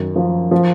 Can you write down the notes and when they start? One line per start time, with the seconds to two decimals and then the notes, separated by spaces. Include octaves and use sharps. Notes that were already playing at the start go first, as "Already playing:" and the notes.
Already playing: F#2 D#3
0.16 F3
0.51 F3